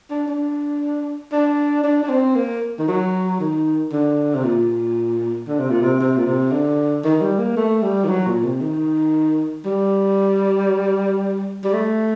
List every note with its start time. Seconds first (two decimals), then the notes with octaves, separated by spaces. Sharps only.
0.10 D4
0.28 D4
1.32 D4
1.84 D4
2.03 D4
2.09 C4
2.36 A#3
2.78 D#3
2.88 F#3
3.40 D#3
3.92 D3
4.35 C3
4.44 A#2
5.48 D3
5.59 C3
5.70 A#2
5.82 C3
6.00 C3
6.17 A#2
6.26 C3
6.52 D3
7.04 D#3
7.21 G3
7.39 A#3
7.57 A3
7.83 G3
8.04 D#3
8.09 F#3
8.26 A#2
8.44 C3
8.61 D#3
9.65 G3
11.64 G3
11.74 A3